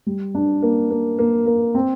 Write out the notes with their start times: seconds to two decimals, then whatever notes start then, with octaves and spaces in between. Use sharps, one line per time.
0.06 G3
0.35 D4
0.62 A#3
0.91 A#3
1.19 A#3
1.46 A#3
1.75 C4